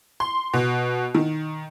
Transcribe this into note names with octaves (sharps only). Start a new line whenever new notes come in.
C6
B2
D#3